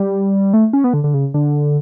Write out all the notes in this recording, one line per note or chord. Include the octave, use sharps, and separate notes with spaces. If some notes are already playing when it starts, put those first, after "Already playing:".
Already playing: G3
A3
C#4
B3
D3
D3
C#3
D3